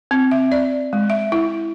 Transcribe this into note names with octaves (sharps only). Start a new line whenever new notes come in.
C4
E5
D5
G#3
E5
E4